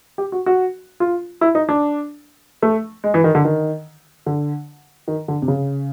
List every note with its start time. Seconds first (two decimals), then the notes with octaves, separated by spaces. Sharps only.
0.18 G4
0.32 F#4
0.46 F#4
1.00 F4
1.41 E4
1.55 D#4
1.69 D4
2.62 A3
3.04 G#3
3.14 E3
3.24 D#3
3.35 D3
3.45 D#3
4.26 D3
5.08 D#3
5.28 D3
5.42 C3
5.48 C#3